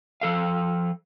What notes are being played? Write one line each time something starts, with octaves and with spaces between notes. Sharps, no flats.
F3 A4 F5